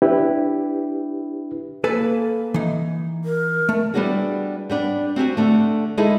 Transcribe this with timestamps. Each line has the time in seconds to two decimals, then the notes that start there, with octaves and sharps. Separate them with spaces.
0.02 D4 E4 G4 B4
1.84 A#3 A4 B4 G#5
2.54 E3 D#4
3.25 A#4
3.69 A3
3.94 G3 B3 D4 E4 F#4 G#4
4.70 G3 B3 D4
5.16 C4 F#4 G4 G#5
5.37 D3 A3
5.97 G#3 D#4 E4 G#4 A4